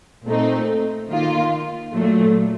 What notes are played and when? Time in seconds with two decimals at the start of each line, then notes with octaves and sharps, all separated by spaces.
0.25 A#2 A3 C4 D#4
1.10 D#3 A#3 F4
1.93 A#2 F#3 A3